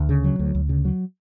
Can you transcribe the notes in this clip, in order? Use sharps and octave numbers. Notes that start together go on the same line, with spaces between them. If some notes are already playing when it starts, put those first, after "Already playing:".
Already playing: D2
C#3
F#3
D2
D2
C#3
F#3